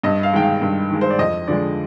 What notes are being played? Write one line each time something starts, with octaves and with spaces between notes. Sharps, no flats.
G2 D#5
F5
D#3 G#3 G5
F5
G2
D#3 G#3
C5
D5
F2 D#5
D3 F3 G#3 D5